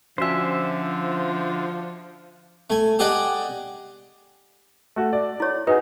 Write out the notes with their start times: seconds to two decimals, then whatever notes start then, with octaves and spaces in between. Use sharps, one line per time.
0.18 D3 F3 C#4 F#4 C5 E5 G#5
2.70 A3 G#5
2.99 G4 G#4 D5 D#5 F#5 G5
4.96 A3 F#4
5.13 D5
5.40 E4 C#5
5.67 D#4 F#4 G#4 B4